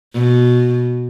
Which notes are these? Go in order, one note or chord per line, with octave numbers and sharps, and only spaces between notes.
B2